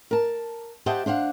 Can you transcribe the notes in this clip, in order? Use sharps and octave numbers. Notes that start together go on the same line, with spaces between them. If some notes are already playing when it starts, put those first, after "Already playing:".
A#4 A5
G4 C5 D#5 E5 F#5 A5
D4 C5 F5 F#5